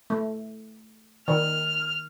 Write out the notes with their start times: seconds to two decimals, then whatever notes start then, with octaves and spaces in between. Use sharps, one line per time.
0.10 A3
1.28 D#3 F6